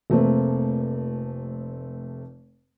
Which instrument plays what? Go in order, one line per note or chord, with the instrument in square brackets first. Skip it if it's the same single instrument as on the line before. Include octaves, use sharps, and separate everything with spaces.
[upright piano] F1 A3 A#3 C4